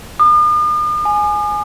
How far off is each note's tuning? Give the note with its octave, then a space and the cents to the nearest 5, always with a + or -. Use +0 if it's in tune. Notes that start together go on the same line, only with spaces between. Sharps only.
D#6 -45
G#5 +10